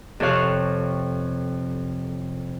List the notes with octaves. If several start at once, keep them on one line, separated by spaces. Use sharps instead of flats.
F2 C3 A4 C#5 F5 F#6